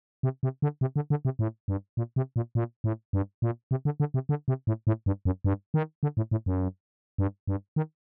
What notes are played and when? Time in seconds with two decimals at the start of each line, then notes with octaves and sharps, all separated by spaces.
0.23 C3
0.43 C3
0.62 D3
0.81 C3
0.96 D3
1.10 D3
1.25 C3
1.39 A2
1.68 G2
1.97 A#2
2.16 C3
2.36 A#2
2.55 A#2
2.84 A2
3.13 G2
3.42 A#2
3.71 C3
3.85 D3
4.00 D3
4.14 C3
4.29 D3
4.48 C3
4.67 A2
4.87 A2
5.06 G2
5.25 F#2
5.45 G2
5.74 D#3
6.03 D3
6.17 A2
6.31 A2
6.46 F#2
7.18 G2
7.47 G2
7.76 D#3